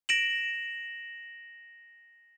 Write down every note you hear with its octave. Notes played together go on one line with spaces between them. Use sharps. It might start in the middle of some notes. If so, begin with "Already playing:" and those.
A#6 D7 E7 F#7